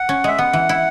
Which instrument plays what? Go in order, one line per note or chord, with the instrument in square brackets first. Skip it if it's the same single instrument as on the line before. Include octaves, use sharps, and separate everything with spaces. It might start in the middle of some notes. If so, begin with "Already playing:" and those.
Already playing: [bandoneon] F#5
[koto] C#4
[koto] G#3 [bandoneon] E5
[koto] B3 [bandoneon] F#5
[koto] E3
E4